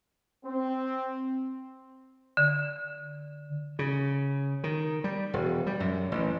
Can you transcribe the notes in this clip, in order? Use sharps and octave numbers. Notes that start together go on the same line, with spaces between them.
C4
D3
C#3
D#3
G3
E1
G3
F#2
A1